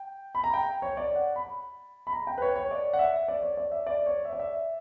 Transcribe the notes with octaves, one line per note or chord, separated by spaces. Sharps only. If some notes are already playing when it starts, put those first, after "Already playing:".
Already playing: G5
B5
A#5
G5
C#5
D5
F#5
B5
B5
A#5
G5
B4
C#5
C#5
D5
F#5
E5
D5
C#5
D5
E5
D5
C#5
E5
D5
E5